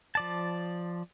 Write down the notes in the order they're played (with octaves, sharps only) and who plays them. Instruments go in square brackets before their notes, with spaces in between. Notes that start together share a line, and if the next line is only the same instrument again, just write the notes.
[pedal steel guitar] F3 D5 A5